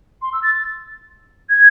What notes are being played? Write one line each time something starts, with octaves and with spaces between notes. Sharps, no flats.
C6
E6
A6
G#6